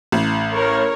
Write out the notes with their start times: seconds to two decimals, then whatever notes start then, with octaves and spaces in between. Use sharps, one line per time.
0.12 A1
0.54 A#4 C#5